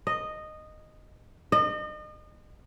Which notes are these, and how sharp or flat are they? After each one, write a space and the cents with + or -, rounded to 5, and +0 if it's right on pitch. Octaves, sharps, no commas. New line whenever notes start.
D#5 -10
D#5 -35